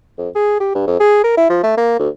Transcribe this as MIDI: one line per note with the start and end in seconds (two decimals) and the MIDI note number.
0.18 0.29 41
0.36 0.57 68
0.60 0.72 67
0.75 0.83 43
0.87 0.98 41
1.00 1.19 68
1.24 1.37 70
1.37 1.48 64
1.50 1.61 53
1.64 1.74 57
1.77 1.99 58
1.99 2.09 38